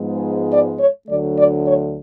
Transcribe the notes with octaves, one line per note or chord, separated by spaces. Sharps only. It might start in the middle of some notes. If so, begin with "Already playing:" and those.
Already playing: G#2 F3 G#3 B3
D5
C#5
D2 D3 F#3 A3 D5
D5
C#5